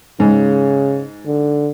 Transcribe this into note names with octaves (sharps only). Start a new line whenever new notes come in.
G#2 C#3
D3